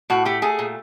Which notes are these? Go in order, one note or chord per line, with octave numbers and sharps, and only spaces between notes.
A2 F#4
A3 G4
A3 G#4
A#2